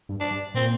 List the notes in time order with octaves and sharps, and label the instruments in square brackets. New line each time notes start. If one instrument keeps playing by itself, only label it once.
[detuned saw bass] G2
[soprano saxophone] D4
[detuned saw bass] G2
[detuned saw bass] A#2 [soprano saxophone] C4